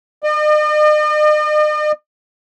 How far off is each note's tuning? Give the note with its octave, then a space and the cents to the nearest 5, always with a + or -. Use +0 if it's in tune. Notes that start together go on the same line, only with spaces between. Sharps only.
D#5 -45